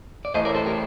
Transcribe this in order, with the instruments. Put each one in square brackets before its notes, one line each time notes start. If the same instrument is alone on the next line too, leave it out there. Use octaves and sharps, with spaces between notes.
[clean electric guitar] D5
[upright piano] A1 A2 A3 [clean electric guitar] C5 D#5
[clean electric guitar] A#4 D5
A4 C5
G4 A#4